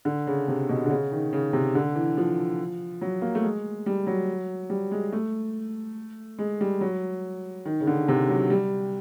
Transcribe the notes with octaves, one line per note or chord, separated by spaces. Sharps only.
D3
C#3
C3
B2
D3
C#3
D#3
C#3
C3
D3
E3
F3
F#3
A#3
A3
G#3
G3
F#3
G3
G#3
A3
G#3
G3
F#3
D#3
C#3
D3
C3
F#3
G3